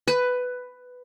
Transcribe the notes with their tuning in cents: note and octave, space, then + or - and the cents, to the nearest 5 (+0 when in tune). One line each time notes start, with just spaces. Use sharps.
B4 +10